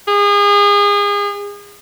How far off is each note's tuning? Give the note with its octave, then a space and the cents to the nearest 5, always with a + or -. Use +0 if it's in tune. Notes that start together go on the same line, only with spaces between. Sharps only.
G#4 -35